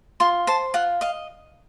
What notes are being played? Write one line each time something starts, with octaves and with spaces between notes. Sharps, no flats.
F4 C6
C5 A5
F4 F#5
D#5 F5